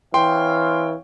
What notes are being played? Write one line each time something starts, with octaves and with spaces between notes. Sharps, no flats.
E3 C4 C#5 F5 G5 C6